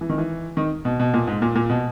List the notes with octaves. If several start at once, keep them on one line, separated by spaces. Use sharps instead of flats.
E3
D#3
E3
D#3
B2
B2
A#2
G#2
A#2
A#2
B2